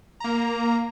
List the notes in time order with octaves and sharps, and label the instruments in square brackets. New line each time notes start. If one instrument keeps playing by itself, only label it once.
[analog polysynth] A#3 A#5